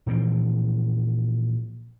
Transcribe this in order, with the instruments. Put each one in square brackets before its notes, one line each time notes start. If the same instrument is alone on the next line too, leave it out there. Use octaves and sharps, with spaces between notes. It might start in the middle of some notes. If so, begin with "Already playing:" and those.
[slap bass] A#2 E3 F3 C4